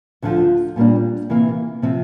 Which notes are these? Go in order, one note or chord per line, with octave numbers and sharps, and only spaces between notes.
D2 D3 F3
A#2 G3 A#3 D4
C3 E3 A#3
C3 F3 C4